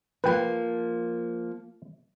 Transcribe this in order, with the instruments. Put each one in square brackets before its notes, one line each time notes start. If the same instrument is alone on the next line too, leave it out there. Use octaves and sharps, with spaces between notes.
[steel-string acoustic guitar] F3 A#3 [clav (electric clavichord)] B4 G5